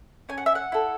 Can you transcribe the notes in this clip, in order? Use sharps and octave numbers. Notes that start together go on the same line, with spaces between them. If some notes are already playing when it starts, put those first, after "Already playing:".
C#4 G#5
F#5
E5
F#5
E4 A4